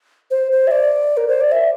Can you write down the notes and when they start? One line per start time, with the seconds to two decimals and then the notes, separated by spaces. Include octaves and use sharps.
0.31 C5
0.52 C5
0.67 E5
0.71 D5
1.17 A#4
1.28 C5
1.40 D5
1.52 E5